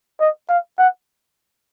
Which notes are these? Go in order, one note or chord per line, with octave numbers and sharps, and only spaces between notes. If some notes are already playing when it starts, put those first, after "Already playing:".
D#5
F5
F#5